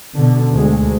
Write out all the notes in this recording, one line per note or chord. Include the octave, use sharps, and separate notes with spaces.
B2 D3
D2 G#3